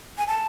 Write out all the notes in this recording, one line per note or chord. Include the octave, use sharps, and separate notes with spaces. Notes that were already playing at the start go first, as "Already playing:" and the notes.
G#5
A5